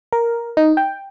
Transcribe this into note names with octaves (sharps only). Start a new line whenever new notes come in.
A#4
D#4
G5